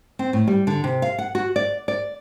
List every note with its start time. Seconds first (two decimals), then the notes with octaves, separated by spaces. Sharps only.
0.19 C4
0.33 A2
0.47 G3
0.67 D3
0.84 C3
1.02 F5
1.19 F#5
1.35 F#4
1.56 D5
1.88 D5